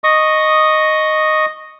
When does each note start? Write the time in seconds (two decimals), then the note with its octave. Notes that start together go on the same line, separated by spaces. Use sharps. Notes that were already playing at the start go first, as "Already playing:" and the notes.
0.04 D#5 C#6 D#6